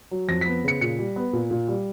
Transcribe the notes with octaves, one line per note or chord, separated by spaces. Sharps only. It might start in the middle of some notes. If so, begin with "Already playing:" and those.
F#3
F2 A#6
B6
B3
C#3 C#7
A#2 C#7
G3
B3
A#2
A#2
G3